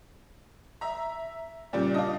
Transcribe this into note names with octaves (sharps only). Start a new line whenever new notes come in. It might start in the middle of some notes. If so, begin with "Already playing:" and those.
E5 A#5
A#2 C#3 G3 D5
D4 F4 D#5